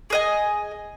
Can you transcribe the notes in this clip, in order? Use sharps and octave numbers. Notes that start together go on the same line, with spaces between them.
G#4 D#5 G#5